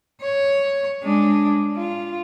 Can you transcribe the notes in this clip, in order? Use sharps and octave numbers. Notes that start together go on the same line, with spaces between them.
C#5
G#3 D4
F4